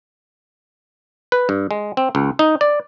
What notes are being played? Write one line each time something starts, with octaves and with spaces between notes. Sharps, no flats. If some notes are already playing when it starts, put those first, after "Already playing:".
B4
G2
G#3
C4
C#2
D#4
D5